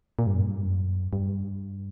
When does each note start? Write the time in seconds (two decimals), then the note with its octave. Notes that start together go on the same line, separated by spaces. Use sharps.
0.19 A#2
0.27 G2
0.34 F#2
0.41 G2
0.65 F#2
1.13 G2